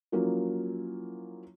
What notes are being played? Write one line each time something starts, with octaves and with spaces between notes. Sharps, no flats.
F3 F#3 A#3 C#4 E4 F#4